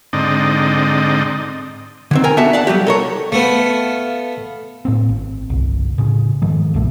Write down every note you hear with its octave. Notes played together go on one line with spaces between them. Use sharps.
G#2 D3 C4 D#4 D5 D#5
D3 D#3 C4
A#4 G5 G#5 A#5
B3 D4 F#4 A4 E5 A5
D5 F5 F#5 A5
F#3 G3 F#4 G4
A4 A#4 C#5
A3 B3 F5
A2 A#3 C4
G#1
G1 C2
A2 C#3
G#2 D#3 F3
B1 G2 A#2 A3